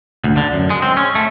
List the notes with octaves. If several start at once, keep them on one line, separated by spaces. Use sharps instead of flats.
D2
D3
F#2
G#3
C4
C#4
A3